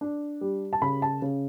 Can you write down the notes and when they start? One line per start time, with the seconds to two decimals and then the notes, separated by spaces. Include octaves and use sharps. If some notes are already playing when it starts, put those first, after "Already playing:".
0.01 D4
0.41 G3
0.73 A5
0.82 C#3 B5
1.02 A5
1.22 C#3